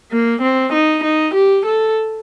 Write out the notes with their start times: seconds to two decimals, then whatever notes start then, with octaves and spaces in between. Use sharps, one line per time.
0.12 A#3
0.42 C4
0.73 D#4
1.04 D#4
1.34 G4
1.66 A4